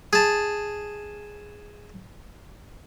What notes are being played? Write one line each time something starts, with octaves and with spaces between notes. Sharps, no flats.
G#4 A5